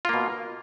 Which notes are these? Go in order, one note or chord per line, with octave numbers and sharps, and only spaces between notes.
B2 A#3 F4